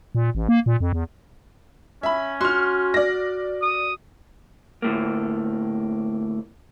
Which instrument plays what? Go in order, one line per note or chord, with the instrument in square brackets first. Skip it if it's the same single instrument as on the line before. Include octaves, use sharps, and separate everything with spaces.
[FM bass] A#2
A1
A#3
A#2
F2
E2
[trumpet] C#4 [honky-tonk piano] E5 B5
[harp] F#4 [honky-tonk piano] C6 F6
[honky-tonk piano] D5 A#6
[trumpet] D#6
[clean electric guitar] D2 A2 A#3